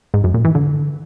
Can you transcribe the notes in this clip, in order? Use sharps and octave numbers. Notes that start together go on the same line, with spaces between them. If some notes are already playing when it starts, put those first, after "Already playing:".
G#2
F#2
A#2
E3
D3